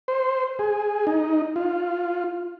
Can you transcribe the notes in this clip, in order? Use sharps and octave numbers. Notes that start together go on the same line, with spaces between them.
C5
G#4
D#4
F4